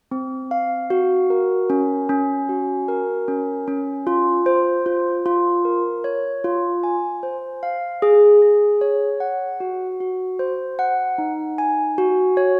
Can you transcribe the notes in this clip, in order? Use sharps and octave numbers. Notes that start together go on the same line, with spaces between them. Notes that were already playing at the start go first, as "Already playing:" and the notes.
C4
F5
F#4
A#4
C#4
C#4
F#4
A#4
C#4
C#4
F4
C5
F4
F4
A#4
C#5
F4
G#5
C5
F5
G#4
G#4
C#5
F#5
F#4
F#4
C5
F#5
D#4
G#5
F#4
C#5